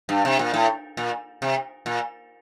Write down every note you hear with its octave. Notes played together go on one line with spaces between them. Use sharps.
G2
C3
A#2
A2
A#2
C3
A#2